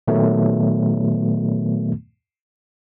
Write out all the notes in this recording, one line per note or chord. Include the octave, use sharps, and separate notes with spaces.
A#2 D#3 F#3 A3 B3